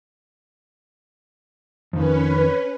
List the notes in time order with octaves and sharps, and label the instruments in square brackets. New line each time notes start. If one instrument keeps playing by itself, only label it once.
[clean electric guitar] F2 D#3 [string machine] C#4 B4